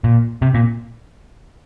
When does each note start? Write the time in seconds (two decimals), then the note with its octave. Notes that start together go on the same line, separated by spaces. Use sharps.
0.04 A#2
0.42 C3
0.54 A#2